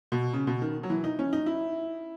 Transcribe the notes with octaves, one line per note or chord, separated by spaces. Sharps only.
B2
C#3
B2
D#3
F#3
E3
D#4
C#4
D#4
E4